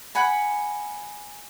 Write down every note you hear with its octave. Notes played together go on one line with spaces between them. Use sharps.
F#5 G#5 B5